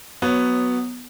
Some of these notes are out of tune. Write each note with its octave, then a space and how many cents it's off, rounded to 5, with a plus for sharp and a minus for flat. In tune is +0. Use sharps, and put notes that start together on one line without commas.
F#3 +0 B3 +0 C#5 -10